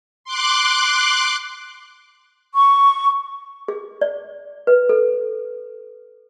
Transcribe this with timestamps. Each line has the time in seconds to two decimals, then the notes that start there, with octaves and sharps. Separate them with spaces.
0.24 C6 D6 F#6
2.55 C#6
3.68 G#4
4.01 D5
4.67 B4
4.89 A4